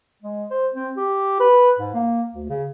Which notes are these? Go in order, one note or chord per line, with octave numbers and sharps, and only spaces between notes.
G#3
C5
C4
G4
B4
G#2
A#3
D2
C#3